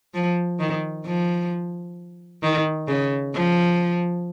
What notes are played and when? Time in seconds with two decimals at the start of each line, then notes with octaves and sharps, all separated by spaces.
0.14 F3
0.59 D#3
1.05 F3
2.43 D#3
2.88 C#3
3.34 F3